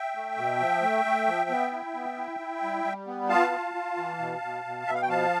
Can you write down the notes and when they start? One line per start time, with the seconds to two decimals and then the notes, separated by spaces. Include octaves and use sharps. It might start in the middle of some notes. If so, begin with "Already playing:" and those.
Already playing: E5 G5
0.15 A3
0.37 B2
0.60 F3
0.82 A3
1.05 A3
1.27 F3
1.49 B3
1.72 E4
1.95 B3
2.17 E4
2.39 E4
2.62 G3
2.84 G3
3.07 B3
3.29 F4 F5 A5
3.51 F4
3.74 F4
3.97 E3
4.19 B2
4.42 B2
4.65 B2
4.87 B2 E5
4.94 F5
5.02 G5
5.09 F3 F5 A5